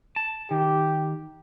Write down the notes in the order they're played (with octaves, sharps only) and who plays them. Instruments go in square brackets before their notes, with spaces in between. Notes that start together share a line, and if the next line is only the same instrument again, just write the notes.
[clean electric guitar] A5
[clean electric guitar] D#3 [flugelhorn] G4